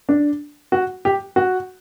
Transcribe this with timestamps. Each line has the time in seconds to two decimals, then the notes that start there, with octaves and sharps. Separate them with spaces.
0.09 D4
0.72 F#4
1.05 G4
1.36 F#4